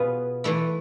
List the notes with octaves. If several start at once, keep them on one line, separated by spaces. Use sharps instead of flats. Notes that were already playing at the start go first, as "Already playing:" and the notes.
Already playing: B2 B3 F4 G#4 B4
E3 A3 E4